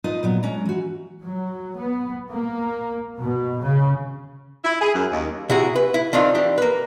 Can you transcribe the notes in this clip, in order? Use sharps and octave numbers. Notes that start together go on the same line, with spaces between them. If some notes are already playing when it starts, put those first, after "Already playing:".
D#4 F4 B4 D#5
A#2 F#3 B3
G#3 C#4 A#5
E3 F#4
F#3
B3
A#3
B2
C#3
E4
G#4
F#2
D#2
C3 E4 F#4 G#4
B4
E4
D#3 C4 D4 F4
E3 D4 G4
A#3 B4